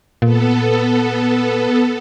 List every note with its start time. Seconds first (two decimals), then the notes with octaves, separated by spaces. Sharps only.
0.22 A#2 B3 A4